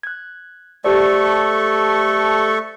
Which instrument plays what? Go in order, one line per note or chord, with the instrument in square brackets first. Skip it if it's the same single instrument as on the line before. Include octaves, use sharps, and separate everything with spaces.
[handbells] F#6 G#6
[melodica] A3 A4 C#6 [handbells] G4 C5 D5